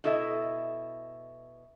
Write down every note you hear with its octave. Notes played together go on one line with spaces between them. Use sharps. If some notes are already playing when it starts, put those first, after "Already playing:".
B2 E4 A4 D#5 E5